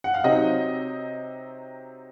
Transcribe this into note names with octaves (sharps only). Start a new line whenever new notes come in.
F#5
F5
C3 F#3 C4 D#4 D#5